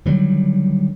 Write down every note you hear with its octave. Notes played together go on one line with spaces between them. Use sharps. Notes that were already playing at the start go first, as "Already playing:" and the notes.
D3 D#3 F#3 G3